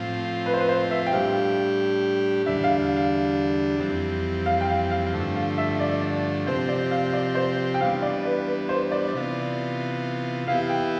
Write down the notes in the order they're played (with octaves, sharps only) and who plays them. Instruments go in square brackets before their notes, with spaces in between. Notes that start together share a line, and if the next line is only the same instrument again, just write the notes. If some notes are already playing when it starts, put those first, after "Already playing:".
Already playing: [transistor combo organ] A2 F3 C4 F4
[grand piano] B4
C5
B4
C5
E5
G5
[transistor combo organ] A2 G3 D4 G4 [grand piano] F5
[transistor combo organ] E2 D3 G3 D4 [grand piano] E5
[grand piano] F5
F5
[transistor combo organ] F2 E3 G3 C4
[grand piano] F5
G5
F5
F5
[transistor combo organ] G2 D3 F3 A3
[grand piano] F5
E5
D5
[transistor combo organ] C3 F3 C4 G4 [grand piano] C5
[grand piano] D5
F5
D5
C5
G5
[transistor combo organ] E3 G3 B3 D4 [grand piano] F5
[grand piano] D5
B4
B4
C5
D5
[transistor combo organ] C3 E3 B3 F4
[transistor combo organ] E3 B3 E4 G4 [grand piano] F5
[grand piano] G5